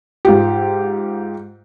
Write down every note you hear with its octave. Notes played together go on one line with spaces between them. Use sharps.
G#2 F4 G4